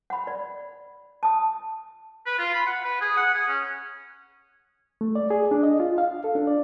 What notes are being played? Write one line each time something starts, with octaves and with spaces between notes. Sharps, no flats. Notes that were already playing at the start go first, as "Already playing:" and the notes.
F#5 B5
D5
A5 D#6
B4
F4
B5
F#5
B4
G#4
F#5
G#4
C#4
A3
D5
G#4
D4
D#5
F4
F5
A4
D4
D5